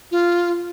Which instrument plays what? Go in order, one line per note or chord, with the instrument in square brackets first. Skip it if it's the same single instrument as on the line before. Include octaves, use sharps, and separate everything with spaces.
[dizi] F4